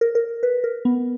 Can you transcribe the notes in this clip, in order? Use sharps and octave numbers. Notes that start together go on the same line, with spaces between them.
A#4
A#4
B4
A#4
B3